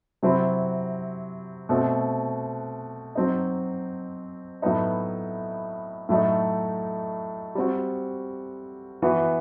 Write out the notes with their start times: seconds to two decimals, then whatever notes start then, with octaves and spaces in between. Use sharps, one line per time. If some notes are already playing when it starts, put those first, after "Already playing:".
0.23 C3 F#3 C4 E4
1.69 B2 A3 C4 F#4
3.15 F#3 C4 D#4
4.62 A2 F#3 B3 D#4
6.09 A2 F#3 A3 D#4
7.55 G3 C4 F#4
9.02 E3 B3 F#4